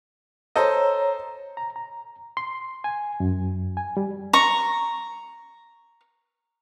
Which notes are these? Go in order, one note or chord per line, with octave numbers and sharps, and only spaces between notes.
A4 C5 C#5 D#5 A#5
A#5
A#5
C6
G#5
F#2
G#5
G3
A#5 C#6